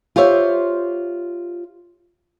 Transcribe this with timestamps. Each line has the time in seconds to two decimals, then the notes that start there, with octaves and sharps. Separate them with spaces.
0.16 F4 G4 C5 C#5 E5